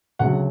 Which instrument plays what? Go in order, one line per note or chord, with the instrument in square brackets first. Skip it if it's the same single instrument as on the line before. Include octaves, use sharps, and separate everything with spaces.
[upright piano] D2 C#3 F#3 F#5